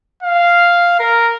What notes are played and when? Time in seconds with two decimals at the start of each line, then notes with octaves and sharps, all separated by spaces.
0.23 F5
0.99 A#4